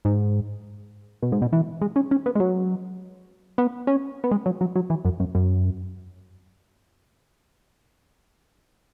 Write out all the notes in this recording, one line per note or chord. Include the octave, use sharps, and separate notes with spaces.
G#2
B2
G#2
B2
E3
G#3
C#4
C#4
B3
G#3
F#3
B3
C#4
B3
G#3
F#3
F#3
F#3
E3
F#2
F#2
F#2